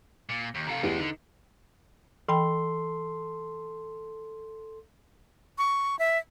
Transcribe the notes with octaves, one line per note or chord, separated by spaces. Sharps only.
A#2
D#2
C3 A4 F5 A#5
E2 G#3 F4 G4
D3 D#4
E3 A4 G5 B5 C6
C#6
E5